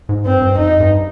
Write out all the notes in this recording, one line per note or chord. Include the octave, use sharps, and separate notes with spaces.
G#2
G2 C4
G2
F2 D#4
G2